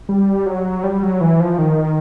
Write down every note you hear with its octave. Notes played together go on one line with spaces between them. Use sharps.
G3
F#3
G3
F#3
E3
F3
D#3